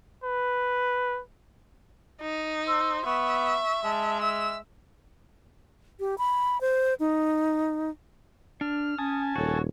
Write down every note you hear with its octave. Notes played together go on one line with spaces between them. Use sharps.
B4
D#4
C5 E6
B3 E5 C#6
G#3 A5
E5 E6
G4
B5
C5
D#4
D4 F6
C#4 G#5 A5 D#6
D#1 F#4 A4 C#5